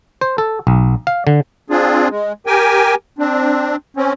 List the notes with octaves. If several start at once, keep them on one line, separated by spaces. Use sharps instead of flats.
C5
A4
B1
F5
D3
C4 D4 F4 G#4
G#3
G4 A#4 G5 G#5
C4 D4
C4 C#4